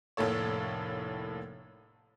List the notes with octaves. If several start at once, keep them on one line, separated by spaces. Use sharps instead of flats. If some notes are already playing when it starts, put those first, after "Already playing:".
F1 A2 A#3 A4 C#5